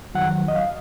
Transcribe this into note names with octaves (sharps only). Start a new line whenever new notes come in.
F2 D#3 F#3 F#5
D#5
F5